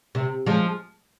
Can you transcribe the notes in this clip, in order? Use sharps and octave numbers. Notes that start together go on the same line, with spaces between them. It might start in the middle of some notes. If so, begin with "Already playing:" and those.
C3
F3 G#3